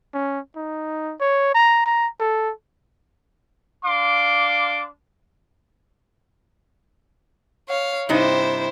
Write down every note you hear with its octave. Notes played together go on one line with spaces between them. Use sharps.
C#4
D#4
C#5
A#5
A#5
A4
D4 F5 C6 D6
C#5 F5
G2 C3 D#4 E4 C5